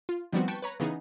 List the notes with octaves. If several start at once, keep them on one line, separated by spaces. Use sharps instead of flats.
F4
D#3 F3 G3 B3 C4 F#4
B4 G5 A5 C#6
B4 C#5 A#5
C#3 E3 B3 D#4 G#4